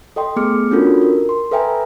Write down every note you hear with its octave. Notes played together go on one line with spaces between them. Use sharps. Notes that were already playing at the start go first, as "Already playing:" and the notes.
A4 D#5 G5 C6
A3 B3 G#4 D6 F6 C#7
C#4 D4 F4 F#4 A4 A#4
A#4
C6
A4 B4 E5 G5 G#5 A#5